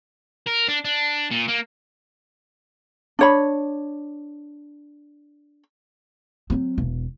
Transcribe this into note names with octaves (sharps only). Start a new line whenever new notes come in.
A#4
D4
D4
A#2
A#3
D4 C#5 B5
F#3 C4
E1